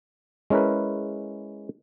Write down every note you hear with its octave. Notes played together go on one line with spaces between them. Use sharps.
G#3 C#4 E4 A#4 B4